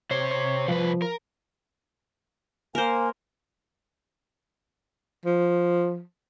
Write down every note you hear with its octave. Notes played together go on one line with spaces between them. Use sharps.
C3 C5 C#5
C#5
C2 F3 B4
A#4
A#3 A#4 C5 G#5
F3